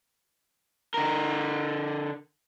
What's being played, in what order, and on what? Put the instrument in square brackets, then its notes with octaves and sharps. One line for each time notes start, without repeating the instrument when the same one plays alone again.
[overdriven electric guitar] D3 A#4